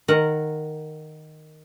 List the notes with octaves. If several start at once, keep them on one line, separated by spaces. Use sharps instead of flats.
D#3 A#4 F#5